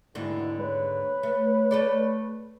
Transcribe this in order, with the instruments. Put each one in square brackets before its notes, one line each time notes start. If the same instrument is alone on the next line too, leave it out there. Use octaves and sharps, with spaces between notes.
[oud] D#2 G#2 D3 [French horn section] B2 E4 [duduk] G#3
[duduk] B4 [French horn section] C#5
[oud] A3
A3 A4 D5